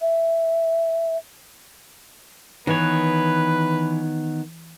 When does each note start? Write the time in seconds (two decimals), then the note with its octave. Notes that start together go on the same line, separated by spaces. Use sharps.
0.01 E5
2.67 D#3 E3 B3 B4 C#5